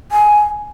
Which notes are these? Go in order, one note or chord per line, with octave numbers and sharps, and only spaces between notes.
G#5